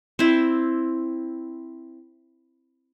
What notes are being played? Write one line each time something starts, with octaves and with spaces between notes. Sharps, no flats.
C4 E4